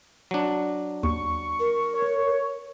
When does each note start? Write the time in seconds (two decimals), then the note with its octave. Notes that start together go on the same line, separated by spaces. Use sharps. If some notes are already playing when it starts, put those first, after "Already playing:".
0.31 F#3 D4
1.03 D#2 C#6
1.60 A#4
1.93 C#5